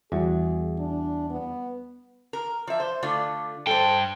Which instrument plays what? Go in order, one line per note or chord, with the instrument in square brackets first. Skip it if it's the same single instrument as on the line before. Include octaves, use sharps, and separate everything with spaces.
[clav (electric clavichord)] E2 [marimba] G3 F#4 [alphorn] G#4
[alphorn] D4
B3
[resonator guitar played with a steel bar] A#4
F3 E5
C5
D3 A3 F4
[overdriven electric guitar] G2 G5 [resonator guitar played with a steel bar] A4 C5